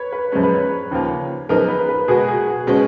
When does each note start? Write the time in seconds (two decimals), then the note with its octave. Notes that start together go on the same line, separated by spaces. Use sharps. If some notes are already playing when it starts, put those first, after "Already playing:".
Already playing: B4 C#5
0.12 B4
0.32 F#2 F3 G#3 C#4 C#5
0.43 B4
0.54 C#5
0.91 D#2 C#3 F3 A#3 F4
1.49 F#2 F3 B3 D#4 G#4 A#4
1.69 B4
1.89 B4
2.08 B2 G#3 B3 F#4 G#4
2.28 G#4
2.47 F#4
2.67 B2 G#3 B3 C#4